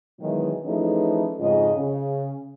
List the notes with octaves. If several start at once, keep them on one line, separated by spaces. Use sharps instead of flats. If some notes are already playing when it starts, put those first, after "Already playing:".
B2 D#3 E3 F#3 G#3
E3 F3 A3 C#4 D#4 G#4
F2 G#2 C#3 G#3 F4 D#5
C#3